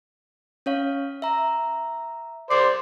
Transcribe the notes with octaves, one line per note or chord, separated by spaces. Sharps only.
C#4 C#5 F5
E5 A#5
C5 D5 D6 C7